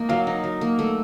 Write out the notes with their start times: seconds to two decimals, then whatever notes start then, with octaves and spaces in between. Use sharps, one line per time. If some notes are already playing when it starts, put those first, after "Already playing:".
Already playing: A#3 D#4
0.09 F#3 F5
0.27 D#4
0.44 F#3
0.61 A#3
0.79 A3